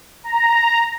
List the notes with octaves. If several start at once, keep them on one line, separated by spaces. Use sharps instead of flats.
A#5